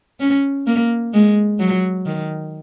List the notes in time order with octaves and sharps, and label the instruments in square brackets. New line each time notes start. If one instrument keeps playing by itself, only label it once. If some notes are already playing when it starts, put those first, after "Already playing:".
[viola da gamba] C#4
A#3
G#3
F#3
D#3